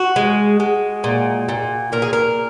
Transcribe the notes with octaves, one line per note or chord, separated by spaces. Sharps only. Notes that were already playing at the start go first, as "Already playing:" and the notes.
Already playing: F#4
G#3
G#3
A#2
A#2
A#2 A#4
G#4
A#4